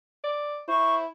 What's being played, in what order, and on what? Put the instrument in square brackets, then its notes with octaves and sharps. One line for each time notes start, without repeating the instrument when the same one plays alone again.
[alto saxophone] D5
[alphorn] E4 [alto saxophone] C5 [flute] C#6